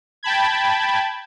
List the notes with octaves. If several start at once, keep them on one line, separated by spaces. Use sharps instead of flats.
G5 A5 B5 G#6